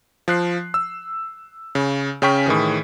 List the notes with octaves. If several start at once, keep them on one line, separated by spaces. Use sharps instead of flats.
F3 F#6 C7
E6
C#3
C#3 C#4 G5 C#6 B6
A2 D#3 E3 G#4